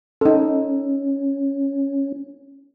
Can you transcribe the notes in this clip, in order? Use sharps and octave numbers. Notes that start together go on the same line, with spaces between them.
C#4 D#4 A4